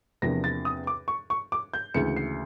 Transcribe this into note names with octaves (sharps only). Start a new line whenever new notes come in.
E2 C3 F3 A#3 D4 A#6
A6
D#6
D6
C#6
C#6
D6
G6
D2 C#3 E3 G#3 C#7
C7